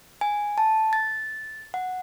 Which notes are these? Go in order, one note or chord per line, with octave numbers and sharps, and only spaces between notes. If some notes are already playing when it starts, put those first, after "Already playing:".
G#5
A5
A6
F#5